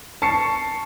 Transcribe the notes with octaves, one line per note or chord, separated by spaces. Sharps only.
A5 C#6 C7 C#7